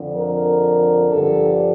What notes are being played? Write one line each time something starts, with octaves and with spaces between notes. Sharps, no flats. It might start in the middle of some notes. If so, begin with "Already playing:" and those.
Already playing: F2 D3 F3
A#4
G2 D3 F3 A4